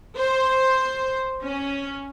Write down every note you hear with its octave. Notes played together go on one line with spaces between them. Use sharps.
C5
C#4